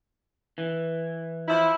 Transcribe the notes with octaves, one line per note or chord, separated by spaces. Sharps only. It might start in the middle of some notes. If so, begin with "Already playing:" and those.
E3
F3 E4